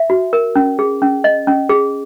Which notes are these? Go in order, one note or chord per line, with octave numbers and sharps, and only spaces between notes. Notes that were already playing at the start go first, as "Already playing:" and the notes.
Already playing: E5
F#4
A#4
C#4
G#4
C#4
D#5
C#4
G#4